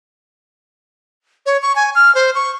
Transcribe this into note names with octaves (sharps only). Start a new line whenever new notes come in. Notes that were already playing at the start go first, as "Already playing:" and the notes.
C#5
C#6
G#5
F6
C5
C#6